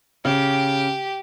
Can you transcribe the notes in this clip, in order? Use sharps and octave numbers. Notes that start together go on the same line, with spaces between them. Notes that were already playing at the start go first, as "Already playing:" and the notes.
C#3 G4